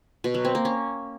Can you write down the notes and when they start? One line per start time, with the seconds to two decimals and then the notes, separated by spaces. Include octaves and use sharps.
0.24 B2
0.34 F#3
0.45 C4
0.55 A#3
0.65 C#4